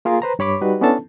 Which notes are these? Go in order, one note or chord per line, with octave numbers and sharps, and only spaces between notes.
A#3 F4 G#4 A#4 F5
B4 C5 A#5
G2 C#5 B5 D6
G3 D#4 F#4 B4
B3 C#4 D4 E4 A4 A5